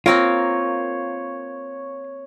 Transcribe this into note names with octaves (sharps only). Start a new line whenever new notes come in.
A#3 C4 F4 A#4 C#5